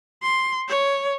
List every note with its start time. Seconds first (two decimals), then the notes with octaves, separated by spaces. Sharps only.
0.22 C6
0.68 C#5